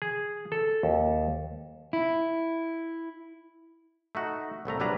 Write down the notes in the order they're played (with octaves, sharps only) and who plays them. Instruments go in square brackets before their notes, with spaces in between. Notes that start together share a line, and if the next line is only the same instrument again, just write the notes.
[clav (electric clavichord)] G#4
A4
D#2
[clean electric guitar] E4
[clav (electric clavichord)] A3 D#4 F#4
C2 A2 A3 A#5
A#1 F#3 G3 D4 B4 A#5